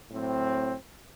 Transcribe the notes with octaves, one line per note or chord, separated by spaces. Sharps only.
A2 F#3 C4